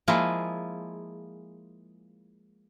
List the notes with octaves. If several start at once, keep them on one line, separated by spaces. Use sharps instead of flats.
F3 G#3 A#3 E4 F4 G#4